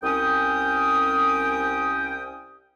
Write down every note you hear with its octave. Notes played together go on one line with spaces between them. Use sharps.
C2 C#4 G5 D#6